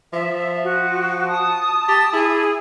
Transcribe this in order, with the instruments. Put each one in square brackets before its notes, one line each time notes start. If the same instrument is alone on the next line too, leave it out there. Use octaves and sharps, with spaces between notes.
[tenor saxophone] F3 [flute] E5
[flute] F#4
[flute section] A5 D#6
[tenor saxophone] G4 [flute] A6
[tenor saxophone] E4 [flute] G#4